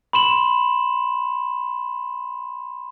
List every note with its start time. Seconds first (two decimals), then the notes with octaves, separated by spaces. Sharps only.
0.13 B5 C6 E7 F#7